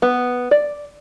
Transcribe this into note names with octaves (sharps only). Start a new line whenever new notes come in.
B3
D5